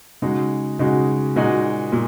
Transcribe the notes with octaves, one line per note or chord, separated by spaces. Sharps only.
C#3 G#3 D#4 F#4
C#3 G#3 D#4 F#4
A#2 G#3 D#4 F#4
A#2